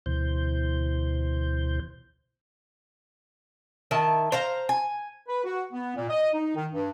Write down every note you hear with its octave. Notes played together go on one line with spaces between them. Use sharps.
D2 B2 E3 C5 G6
D#3 E4 A5
C5 F5 A#5
G#5
B4
F#4
B3
A#2
D#5
D#4
D#3
G2